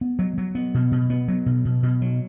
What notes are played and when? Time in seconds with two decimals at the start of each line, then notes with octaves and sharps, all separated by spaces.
0.01 B3
0.19 F#3
0.38 F#3
0.55 B3
0.74 B2
0.92 B2
1.10 B3
1.28 F#3
1.46 B2
1.65 B2
1.83 B2
2.02 F#3